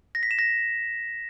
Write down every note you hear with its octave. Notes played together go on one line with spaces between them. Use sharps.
A#6
B6
E7
A#6